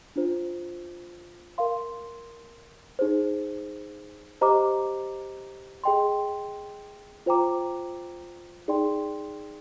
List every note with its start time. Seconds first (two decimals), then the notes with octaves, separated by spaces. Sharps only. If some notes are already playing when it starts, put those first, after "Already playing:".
0.16 D4 F4 C5
1.58 A#4 F5 C6
2.99 D#4 G#4 C5
4.41 G4 C5 D#5 A#5 D6
5.84 G#4 D#5 G5 C6
7.26 F4 C5 G5 A#5 D6
8.68 D#4 G#4 D5 G5 C6